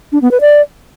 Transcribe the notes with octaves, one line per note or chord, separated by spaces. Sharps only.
D4
B3
B4
D5